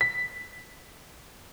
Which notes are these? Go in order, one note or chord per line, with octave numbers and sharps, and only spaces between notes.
B6